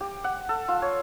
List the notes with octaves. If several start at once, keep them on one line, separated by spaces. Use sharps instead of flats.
G4
F#5
A4
F4
C#5